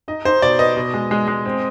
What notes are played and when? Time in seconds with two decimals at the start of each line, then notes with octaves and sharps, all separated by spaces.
0.08 D#4 D#5
0.25 D#4 C5
0.42 B2 D5
0.59 B3 D#5
0.77 B2
0.94 G#3
1.11 G#3
1.28 G#3
1.45 C4